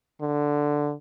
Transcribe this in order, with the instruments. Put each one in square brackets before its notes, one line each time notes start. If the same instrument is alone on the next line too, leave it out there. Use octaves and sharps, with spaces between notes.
[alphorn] D3